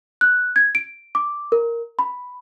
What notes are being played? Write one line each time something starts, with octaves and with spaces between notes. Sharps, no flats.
F#6
G#6
D7
D6
A#4
B5